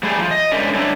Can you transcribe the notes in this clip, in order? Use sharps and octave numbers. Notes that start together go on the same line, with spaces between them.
G3 A3 G#4
F3
D#5
G#2 D3 C#4 A#4 D5 E5
G3 D4 A4 C#5 D5 E5